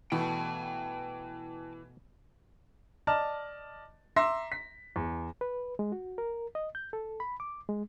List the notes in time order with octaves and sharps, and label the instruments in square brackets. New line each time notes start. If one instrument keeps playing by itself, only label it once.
[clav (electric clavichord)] B2 A3 [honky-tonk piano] E3 [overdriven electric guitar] G5 A5
[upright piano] D5 D#5 A5 F6
E5 A#5 C6 D6 A#6
B6
E2
[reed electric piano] B4
G#3
F#4
A#4
D#5
G6
A4
B5
D6
G#3